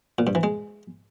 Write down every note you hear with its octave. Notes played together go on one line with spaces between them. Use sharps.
A#2
G2
E3
G#3